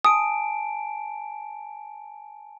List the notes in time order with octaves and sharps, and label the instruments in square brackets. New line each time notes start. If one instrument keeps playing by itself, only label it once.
[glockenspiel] G#5 A5 D7 [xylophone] D#6